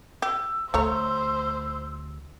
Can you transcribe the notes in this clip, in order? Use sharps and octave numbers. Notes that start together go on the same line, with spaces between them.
G4 E6
D2 A3 C5 C#5 A#5